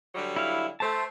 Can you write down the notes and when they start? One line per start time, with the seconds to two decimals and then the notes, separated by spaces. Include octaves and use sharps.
0.15 D3 F#3 G3
0.36 E4 F5
0.80 A3 C5 A5